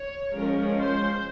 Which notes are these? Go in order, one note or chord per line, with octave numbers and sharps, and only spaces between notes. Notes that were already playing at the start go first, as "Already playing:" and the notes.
Already playing: C#5
F3 G#3 C#4 A#4
C5